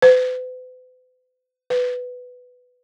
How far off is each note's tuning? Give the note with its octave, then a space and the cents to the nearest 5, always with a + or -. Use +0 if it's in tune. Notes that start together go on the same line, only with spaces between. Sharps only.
B4 +45
B4 +5